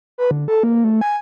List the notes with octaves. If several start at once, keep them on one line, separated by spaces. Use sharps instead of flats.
B4
D3
A4
A#3
A3
G#5